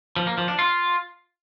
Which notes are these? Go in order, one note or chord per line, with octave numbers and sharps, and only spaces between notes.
F3
A#3
F3
D4
F4